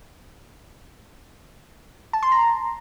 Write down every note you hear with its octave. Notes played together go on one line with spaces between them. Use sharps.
A5
C6
A#5